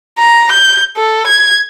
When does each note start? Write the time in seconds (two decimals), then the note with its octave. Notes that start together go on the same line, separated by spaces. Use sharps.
0.19 A#5
0.52 G6
0.97 A4
1.27 G#6